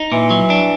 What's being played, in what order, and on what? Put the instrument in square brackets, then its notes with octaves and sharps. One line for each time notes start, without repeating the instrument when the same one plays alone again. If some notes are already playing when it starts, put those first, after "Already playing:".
Already playing: [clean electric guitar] D#4
[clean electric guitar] A#2 [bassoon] E3
[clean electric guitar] F#3
D4